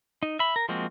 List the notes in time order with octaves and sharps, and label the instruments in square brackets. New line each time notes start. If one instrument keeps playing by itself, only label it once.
[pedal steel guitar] D#4
E5 B5
A#4
F3 G#3 A#3 C4 F#4